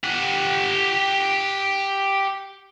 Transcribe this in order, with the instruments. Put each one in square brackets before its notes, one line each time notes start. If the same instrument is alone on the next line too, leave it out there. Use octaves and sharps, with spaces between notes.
[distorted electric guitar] G4 F#5